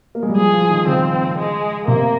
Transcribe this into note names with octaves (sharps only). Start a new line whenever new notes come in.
A#3
G#3
G3
F3 G#4
F3
D#3
C#3 C4
G#3
C3 A#3